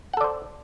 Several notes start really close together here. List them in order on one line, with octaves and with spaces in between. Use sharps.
F#5 A4 D5 C5